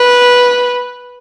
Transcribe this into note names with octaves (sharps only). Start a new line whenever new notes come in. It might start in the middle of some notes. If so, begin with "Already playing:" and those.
Already playing: B4